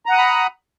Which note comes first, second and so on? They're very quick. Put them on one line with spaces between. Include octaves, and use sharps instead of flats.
A#5 F#5 D#6 F#6 B5